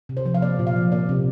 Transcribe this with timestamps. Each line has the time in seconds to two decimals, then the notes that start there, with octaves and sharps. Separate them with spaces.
0.09 C3
0.17 C5
0.26 F3
0.34 F5
0.42 A#3 D5
0.59 A#2
0.67 F5
0.76 F3
0.92 A#3 D5
1.09 C3